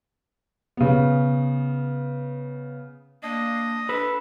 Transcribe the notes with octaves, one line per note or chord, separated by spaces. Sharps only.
C#3 B3
A#3 D4 D#5
D4 A4 B4